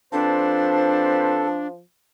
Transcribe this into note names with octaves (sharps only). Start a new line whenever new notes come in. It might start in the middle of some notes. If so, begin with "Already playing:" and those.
F3 C4 D4 A4 B4 C5